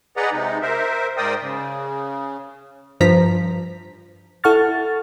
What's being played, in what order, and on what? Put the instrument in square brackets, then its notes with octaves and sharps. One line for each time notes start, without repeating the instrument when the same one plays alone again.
[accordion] G#4 B4 D5 D#5 F#5 A#5
C3 G#3 D#4
A#4 C5 E5
G#2 A#4 C5 D5 G5 D#6
C#3
[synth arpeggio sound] G2 F3 A#5 B6
[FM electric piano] E4 A4 F#5 C#6 F6 A6